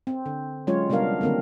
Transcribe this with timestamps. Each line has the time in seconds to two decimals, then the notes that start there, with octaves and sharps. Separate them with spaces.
0.07 C4
0.26 D3
0.67 F#3 G#3 C#4 F4 C#5
0.90 C3 G3 B3 D4 A#4 F5
1.21 D3 D#3 A#3 C4 A#4